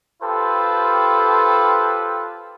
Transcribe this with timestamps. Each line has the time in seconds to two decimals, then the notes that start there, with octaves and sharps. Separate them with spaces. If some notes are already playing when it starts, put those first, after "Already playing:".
0.22 F4 G4 A4 B4 C5